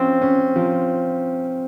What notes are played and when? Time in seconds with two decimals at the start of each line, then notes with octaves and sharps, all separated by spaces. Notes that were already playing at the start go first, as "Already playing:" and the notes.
Already playing: F3 C4 C#4
0.21 C#4
0.56 F3